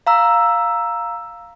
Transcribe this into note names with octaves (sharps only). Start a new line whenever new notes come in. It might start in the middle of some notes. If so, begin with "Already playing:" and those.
F5 A#5 E6